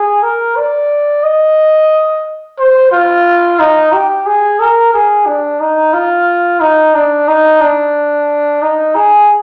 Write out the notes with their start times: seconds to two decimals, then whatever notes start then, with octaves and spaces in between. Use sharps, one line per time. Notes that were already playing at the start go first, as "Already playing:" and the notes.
Already playing: G#4
0.23 A#4
0.56 D5
1.24 D#5
2.59 C5
2.92 F4
3.60 D#4
3.93 G4
4.26 G#4
4.60 A#4
4.94 G#4
5.27 D4
5.60 D#4
5.94 F4
6.60 D#4
6.95 D4
7.28 D#4
7.61 D4
8.62 D#4
8.95 G#4